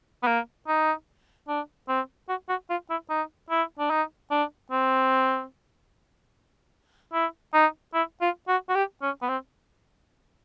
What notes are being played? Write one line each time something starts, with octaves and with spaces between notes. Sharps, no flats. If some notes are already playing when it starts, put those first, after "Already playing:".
B3
A#3
D#4
D4
C4
F#4
F#4
F4
E4
D#4
E4
D4
D#4
D4
C4
E4
D#4
E4
F4
F#4
F#4
G4
C#4
B3
C4